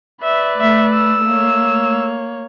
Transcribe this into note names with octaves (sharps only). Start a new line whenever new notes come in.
B4 D5 E5
A3 E5
E6
A#3 C#5